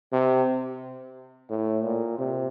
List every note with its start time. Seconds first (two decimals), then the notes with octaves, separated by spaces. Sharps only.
0.12 C3
1.50 A2
1.83 A#2
2.18 C3